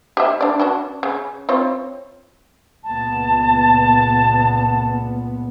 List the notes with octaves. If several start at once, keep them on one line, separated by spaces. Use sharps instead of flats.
G4 D#5 E5
D4 D5
C#4 D4 F#4
C#3
C4 F4 C#5
C#2 A#2 B3 A5